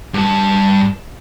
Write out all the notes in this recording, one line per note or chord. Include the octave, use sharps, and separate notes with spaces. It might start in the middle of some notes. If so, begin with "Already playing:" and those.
G2 A5